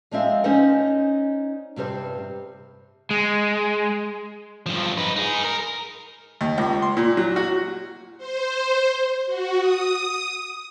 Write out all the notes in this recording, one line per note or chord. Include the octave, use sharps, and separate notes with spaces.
F3 G#3 C4 E5 F5
C#4 D#4 C5 D5 D#5 F#5
G2 C3 G3 C5
G#3
G2 F3
D#4 B4
D#4 G#4
A#4
D#2
C#2
C6
A#2
F#3
F#4
C5
F#4
D#6